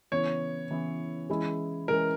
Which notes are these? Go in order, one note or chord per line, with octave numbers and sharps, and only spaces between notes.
C#3 E3 B3 E4 C#5
C#3 E3 B3 E4
E3 G#3 C#4 E4 G#4
E3 G#3 C#4 E4 G#4 A#4